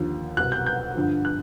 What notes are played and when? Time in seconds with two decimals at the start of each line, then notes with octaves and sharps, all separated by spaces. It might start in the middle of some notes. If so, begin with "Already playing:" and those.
Already playing: D#2 D3 F3
0.37 C2 B2 F#6
0.52 G6
0.66 G6
0.95 G2 D3 F3
1.25 F#6